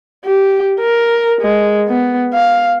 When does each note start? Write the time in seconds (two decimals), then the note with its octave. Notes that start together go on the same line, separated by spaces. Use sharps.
0.25 G4
0.80 A#4
1.41 G#3
1.88 B3
2.34 F5